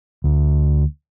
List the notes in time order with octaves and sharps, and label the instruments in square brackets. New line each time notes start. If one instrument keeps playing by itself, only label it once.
[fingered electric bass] D2